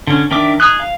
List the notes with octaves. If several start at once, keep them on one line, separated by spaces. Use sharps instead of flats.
D3 C#4
D#3 D4 A#4 E5 D6
D#4 G#4 D#6 F#6
F5